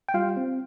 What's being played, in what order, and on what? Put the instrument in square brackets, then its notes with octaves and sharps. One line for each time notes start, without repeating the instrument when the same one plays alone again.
[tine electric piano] G5
G3 F4 F5
C4